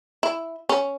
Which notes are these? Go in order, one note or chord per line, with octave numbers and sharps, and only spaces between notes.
E4
C#4